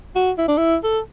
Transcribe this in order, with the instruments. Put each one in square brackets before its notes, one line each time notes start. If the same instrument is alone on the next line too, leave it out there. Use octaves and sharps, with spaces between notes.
[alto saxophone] F#4
E4
D4
E4
A4